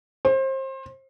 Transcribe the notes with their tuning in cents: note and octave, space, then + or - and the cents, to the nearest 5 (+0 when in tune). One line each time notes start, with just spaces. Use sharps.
C5 +30